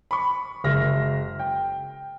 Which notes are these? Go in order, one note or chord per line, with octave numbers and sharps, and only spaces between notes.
B5 C#6
F#1 G#3 E5 F6 A#6
G5